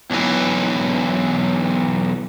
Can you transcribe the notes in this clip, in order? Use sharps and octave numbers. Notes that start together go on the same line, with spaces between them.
B1 E3